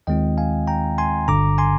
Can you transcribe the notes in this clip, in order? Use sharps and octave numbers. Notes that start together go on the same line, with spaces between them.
D#2 D#3 G#3 C4 F4 D#5 G5
F5 G#5
G5 A#5
G#5 C6
G1 G2 D3 A#5 D6
G#5 C6